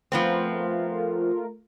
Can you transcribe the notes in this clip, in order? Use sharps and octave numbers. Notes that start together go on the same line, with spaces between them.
F3 A3 B3 C4 F4 A#4